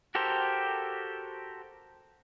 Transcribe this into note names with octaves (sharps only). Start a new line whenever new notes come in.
F#4 G4 A4 A#4 C5